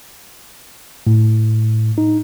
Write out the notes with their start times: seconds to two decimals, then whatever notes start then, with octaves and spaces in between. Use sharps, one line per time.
1.07 A2
1.98 D#4